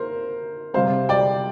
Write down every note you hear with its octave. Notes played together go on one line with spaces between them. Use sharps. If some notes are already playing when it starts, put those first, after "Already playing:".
Already playing: A#3 A#4 C5
C3 G3 C4 C5 F5
D5 G5